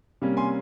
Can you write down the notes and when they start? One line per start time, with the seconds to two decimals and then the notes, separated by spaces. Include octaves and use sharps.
0.22 C3 G3 A#3 C#4
0.37 G#5 C6